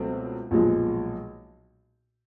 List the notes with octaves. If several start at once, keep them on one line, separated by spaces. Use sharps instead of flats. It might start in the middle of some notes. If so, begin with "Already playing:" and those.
Already playing: C#2 B2 F#3 A3 C4
B1 A#2 F3 G#3